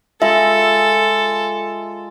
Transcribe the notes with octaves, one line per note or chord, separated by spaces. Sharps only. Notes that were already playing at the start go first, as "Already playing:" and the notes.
G#3 F4 A4 E5 B5